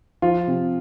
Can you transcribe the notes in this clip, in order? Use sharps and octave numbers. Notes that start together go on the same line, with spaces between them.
F3 F4
C3